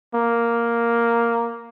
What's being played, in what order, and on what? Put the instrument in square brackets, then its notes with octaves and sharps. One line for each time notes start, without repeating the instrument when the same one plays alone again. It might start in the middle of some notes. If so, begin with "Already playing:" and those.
[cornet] A#3